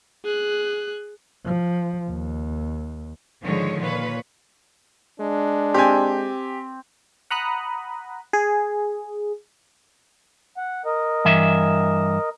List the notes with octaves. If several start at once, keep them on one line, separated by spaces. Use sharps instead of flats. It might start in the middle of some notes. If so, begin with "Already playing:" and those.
G#4 F#6
F3
D#2
G#2 D3 D#3 F3 G#3 C#5
A#2 B4 C#5
G#3 D4
C4 G4 G#5
F#5 A#5 B5 D#6 F#6
G#4
F#5
A#4 D#5
G2 E3 E5